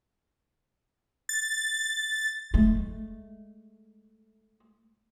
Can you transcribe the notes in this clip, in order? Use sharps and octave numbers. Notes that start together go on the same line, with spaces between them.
A6
G#3 A3